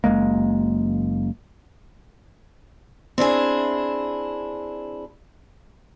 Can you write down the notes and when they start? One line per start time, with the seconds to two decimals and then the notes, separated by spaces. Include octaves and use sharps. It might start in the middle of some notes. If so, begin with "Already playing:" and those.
0.04 F#1 E2 G#3 A#3
3.18 C4 D4 E4 G#4